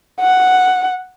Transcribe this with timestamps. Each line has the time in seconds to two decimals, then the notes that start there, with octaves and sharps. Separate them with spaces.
0.20 F#5